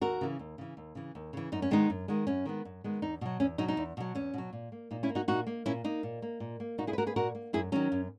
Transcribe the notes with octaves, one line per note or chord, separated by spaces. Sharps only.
D#2 F#4 A#4
C#3 E3
D#2
C#3 E3
D#2
C#3 E3
D#2
C#3 E3
F#2 D#4
C#4
D#3 G#3 B3 D#4
F#2
D#3 G#3 B3
F#2 C#4
D#3 G#3 B3
F#2
D#3 G#3 B3
E2 D#4
B2 F#3
E2 C#4
B2 F#3 D#4
D#4
E2
B2 F#3
E2 C#4
B2 F#3
A#2
A#3
A#2 D#4
C#4 E4
A#3
D#4 F#4
A#2 D#4 F#4
A#3
A#2 C#4 E4
A#3 D#4
A#2
A#3
A#2
A#3
A#2 D#4 F#4
E4 G#4
B4
A#3 F#4 A#4
G#4 B4
A#2 F#4 A#4
A#3
F#2 E4 G#4
D#3 F#3 C#4
F#2